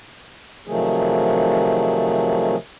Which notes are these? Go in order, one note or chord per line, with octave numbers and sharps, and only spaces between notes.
C3 D#3 F3 F#3 A3 G#4